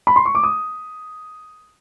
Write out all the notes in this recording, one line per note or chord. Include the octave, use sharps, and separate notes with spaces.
B5
C6
C#6
D6
D#6